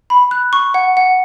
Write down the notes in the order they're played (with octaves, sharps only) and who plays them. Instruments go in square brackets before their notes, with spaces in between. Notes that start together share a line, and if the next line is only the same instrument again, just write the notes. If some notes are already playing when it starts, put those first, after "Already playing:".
[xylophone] B5
F#6
C#6
F#5
F#5